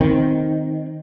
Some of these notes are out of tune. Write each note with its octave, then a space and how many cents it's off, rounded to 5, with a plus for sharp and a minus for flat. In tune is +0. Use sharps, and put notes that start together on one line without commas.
D#3 +5 C4 +0